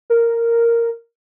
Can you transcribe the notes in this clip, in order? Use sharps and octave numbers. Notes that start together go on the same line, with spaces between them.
A#4